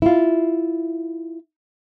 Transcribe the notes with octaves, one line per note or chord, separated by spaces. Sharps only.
E4 F4